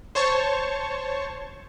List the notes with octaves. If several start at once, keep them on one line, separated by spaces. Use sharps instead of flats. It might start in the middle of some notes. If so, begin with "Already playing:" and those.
C5 C#5 A5 C#6